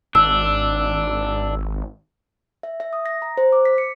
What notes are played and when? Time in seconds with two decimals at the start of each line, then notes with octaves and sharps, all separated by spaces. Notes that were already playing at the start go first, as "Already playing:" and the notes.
0.15 G#1 D4 E6
2.63 E5
2.80 E5
2.93 D#6
3.06 A#6
3.22 A#5
3.37 C5
3.52 D6
3.65 B6
3.78 C#7